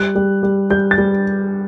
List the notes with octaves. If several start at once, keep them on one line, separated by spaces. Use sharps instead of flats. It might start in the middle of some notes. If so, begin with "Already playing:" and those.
Already playing: G3 F#6
G3
G3
G3 G6
A6
G3